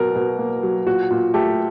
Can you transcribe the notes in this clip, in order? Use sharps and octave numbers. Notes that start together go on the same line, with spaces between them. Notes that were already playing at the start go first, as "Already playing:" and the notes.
Already playing: B2 F#3 A#3 A#4
B2
A#3
F#3
A#2 F#4
A#2
A3 G4